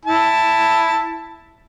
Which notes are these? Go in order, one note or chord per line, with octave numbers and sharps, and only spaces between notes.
E4 A5